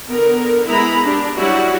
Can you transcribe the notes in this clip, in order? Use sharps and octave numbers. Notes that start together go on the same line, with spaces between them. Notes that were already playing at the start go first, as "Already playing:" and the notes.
D3 B3 A#4
G#3 B3 E4 A#5 B5
D4 G4
F#3 G3 E4 F#4